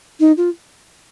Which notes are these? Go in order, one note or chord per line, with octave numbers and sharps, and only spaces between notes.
D#4
F4